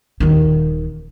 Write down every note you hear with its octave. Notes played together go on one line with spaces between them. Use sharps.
D#1 D#3